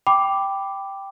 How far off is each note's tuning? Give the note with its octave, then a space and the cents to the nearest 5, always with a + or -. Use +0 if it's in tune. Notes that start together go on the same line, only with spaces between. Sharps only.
G5 +0 B5 +10 D6 +0